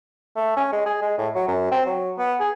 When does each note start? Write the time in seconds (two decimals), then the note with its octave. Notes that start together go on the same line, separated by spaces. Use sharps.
0.36 A3
0.57 C#4
0.73 G#3
0.86 G#4
1.02 G#3
1.18 A2
1.35 F#3
1.48 F#2
1.72 C4
1.86 F#3
2.18 B3
2.40 G#4